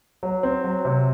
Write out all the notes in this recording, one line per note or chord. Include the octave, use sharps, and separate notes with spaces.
F#3
C4
F#3
C3